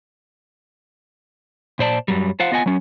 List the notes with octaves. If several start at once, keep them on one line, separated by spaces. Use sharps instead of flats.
A#2 C5 D5 A5
F#2 F#3 G3
F4 C5 F5 F#5
B3 F4 D#5 F#5 G#5
F#3 C#4